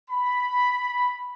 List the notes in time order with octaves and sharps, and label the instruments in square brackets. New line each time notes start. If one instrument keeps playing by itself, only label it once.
[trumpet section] B5